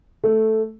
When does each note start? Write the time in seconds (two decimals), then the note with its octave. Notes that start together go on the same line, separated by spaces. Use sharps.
0.24 A3